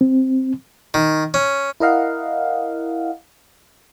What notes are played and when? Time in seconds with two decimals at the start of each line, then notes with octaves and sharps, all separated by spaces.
0.01 C4
0.94 D#3
1.34 C#4
1.80 E4 A#4 D#5 F5 F#5